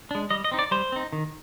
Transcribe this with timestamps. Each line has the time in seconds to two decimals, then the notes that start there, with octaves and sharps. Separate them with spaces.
0.11 G#3 D4
0.31 G3 D#5
0.44 D#5
0.51 C4 D#4
0.59 D5
0.71 G3 C5
0.92 C4 D#4
1.13 D#3